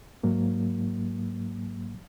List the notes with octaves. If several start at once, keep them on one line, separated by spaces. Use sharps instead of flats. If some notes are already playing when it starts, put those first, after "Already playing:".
G#2 F#3 A#3